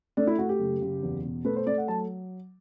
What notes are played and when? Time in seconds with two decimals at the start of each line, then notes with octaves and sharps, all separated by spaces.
0.17 A3 D4
0.27 E4
0.39 A3 F#4
0.49 G4
0.59 F#1
0.81 F#1
1.03 E2
1.24 B2
1.45 A3 B4
1.56 C5
1.67 A3 D5
1.78 F#5
1.88 F#3 A5